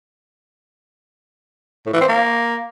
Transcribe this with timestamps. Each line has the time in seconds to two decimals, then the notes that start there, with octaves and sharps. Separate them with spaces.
1.86 A2
1.93 E3
2.01 C4
2.08 A#3